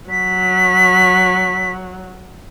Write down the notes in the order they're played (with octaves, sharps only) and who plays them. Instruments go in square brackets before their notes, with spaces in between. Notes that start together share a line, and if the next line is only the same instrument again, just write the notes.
[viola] F#3 [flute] B6